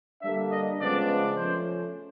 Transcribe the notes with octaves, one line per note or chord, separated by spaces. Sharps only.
D3 G3 A#3 D4 E5
D#5
C#3 F3 G#3 B3 D4 D5
F3 A3 C#4 C5